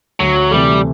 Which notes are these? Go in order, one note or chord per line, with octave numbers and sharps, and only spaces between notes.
D2 F#3
C3 E3 G3 A3